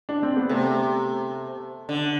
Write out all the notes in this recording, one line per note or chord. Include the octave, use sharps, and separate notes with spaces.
D4
C4
B3
C3 A3
D3